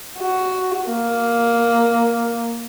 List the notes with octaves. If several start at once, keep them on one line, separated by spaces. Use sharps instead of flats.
F#4
A#3